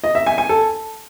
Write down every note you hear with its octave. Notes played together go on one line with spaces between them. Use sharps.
D#5
E5
G#5
G#5
A4